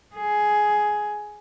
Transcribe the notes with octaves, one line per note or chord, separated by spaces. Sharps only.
G#4